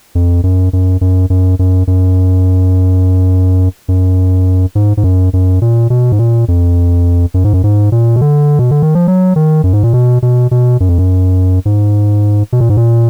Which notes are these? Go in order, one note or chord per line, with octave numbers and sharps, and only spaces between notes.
F2
F#2
F#2
F#2
F#2
F#2
F#2
F#2
G#2
G#2
F#2
F#2
A#2
B2
G#2
A#2
F2
F#2
G#2
F#2
G#2
A#2
B2
D3
B2
D3
D#3
F3
F#3
D#3
F#2
G#2
A#2
B2
B2
B2
F#2
F2
F#2
G#2
B2
A#2
G#2
A#2